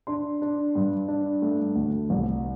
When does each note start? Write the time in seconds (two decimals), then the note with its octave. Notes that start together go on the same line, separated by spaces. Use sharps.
0.07 D4 C6
0.42 D4
0.75 G2
1.08 D4
1.42 A3
1.76 D2
2.10 C2